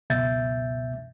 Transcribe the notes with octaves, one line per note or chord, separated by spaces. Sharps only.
C#2 F#2 B2 E5 G6 A6